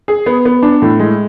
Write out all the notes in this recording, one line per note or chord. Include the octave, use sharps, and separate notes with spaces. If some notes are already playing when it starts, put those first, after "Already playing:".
G#4
B3
B3
D4
A2
G#3